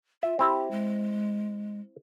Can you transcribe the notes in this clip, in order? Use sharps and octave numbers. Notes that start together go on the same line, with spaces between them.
F4 E5
C4 E4 G4
G#3